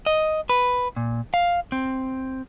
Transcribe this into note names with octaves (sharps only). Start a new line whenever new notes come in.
D#5
B4
A#2
F5
C4